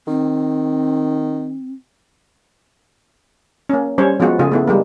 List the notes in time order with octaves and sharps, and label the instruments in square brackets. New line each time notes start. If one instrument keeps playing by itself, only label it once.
[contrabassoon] D#3 [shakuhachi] C4
[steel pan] A#3 C#4
G3 C#4 C5 C#5
F3 G#3 B3 F4 F#4
C#3 A3 F4 G#4
A3 B3 E4
G3 G#3 A#3